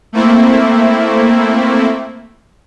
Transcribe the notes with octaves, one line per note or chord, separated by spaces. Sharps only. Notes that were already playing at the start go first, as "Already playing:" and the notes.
A3 A#3 C4 E4